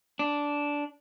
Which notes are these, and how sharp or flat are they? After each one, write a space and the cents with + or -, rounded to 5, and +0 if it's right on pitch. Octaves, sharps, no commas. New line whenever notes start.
D4 -10